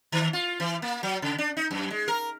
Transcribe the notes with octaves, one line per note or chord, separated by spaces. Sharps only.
D#3
F4
E3
A#3
F#3
C#3
D4
D#4
F#2
G#3
A#4